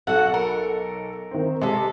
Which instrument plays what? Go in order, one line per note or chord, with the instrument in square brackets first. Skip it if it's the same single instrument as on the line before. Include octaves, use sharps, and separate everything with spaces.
[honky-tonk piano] B1 A4 [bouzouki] F#4 F#5
[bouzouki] A#4
[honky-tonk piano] D#3 C4
[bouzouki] C3 A4 [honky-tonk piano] G#3